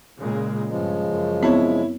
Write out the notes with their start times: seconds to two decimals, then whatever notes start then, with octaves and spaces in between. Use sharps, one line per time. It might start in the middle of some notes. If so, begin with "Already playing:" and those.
0.19 A#2 C#3 G#3
0.69 G2 C#3 F3 G#3
1.08 F#2
1.43 B3 C4 E4 C#5